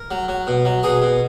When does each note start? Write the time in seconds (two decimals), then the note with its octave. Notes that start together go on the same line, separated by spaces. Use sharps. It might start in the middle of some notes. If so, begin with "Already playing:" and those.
Already playing: A#4
0.11 F#3
0.28 F#3
0.47 B2
0.65 F#3
0.83 B2 G#4
1.02 B2